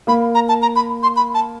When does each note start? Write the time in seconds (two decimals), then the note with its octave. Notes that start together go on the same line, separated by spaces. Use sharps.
0.07 A#3 B5
0.35 A#5
0.49 A5
0.62 A#5
0.76 B5
1.03 C6
1.16 B5
1.34 A5